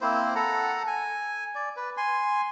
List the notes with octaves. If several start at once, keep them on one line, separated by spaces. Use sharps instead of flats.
A#3 C4 E4 C5
A4 F#5 A#5
G#5
D5
B4
G#5 C6